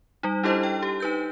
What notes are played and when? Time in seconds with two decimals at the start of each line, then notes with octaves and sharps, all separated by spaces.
0.23 G3 D#4
0.43 D4 E4 G4 A4 C5 D#5
0.63 G5
0.82 G4
1.00 D#4 B4 G6